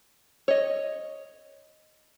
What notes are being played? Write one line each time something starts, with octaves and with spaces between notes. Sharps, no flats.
C#5 D#5